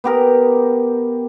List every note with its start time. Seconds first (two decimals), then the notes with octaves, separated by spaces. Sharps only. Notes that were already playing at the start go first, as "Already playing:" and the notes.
0.04 B3 G4 A#4